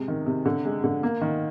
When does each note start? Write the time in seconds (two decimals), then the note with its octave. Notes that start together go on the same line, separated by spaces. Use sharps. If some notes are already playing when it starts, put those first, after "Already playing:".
Already playing: C3 G#3
0.08 D#3
0.26 C3
0.46 D3
0.65 G#3
0.84 D3
1.03 A#3
1.21 D#3